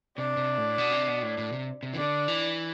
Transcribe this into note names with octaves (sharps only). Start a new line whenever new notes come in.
C3 D4
C3
A2
B2
C3
B2
A2
A2
C3
C3
E3
D3 D4
E3